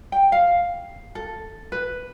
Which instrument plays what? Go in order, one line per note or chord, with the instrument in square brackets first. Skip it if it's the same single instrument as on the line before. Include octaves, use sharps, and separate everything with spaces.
[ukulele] G5
F5
A4
B4